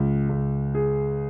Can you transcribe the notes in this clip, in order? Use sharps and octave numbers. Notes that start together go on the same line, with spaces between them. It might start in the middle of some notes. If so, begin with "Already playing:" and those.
Already playing: C#2
C#2
G#4